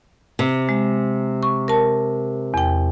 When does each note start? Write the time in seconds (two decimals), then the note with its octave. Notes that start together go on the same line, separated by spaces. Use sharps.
0.39 C3
0.69 G#3
1.43 C#6
1.68 A#4 A5
2.54 E2 G5